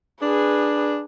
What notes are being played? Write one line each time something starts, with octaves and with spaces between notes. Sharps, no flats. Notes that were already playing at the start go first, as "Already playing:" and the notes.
D4 G#4 B4